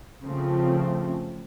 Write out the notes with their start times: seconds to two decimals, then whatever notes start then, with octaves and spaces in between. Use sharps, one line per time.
0.22 C#3 F3 A3 C4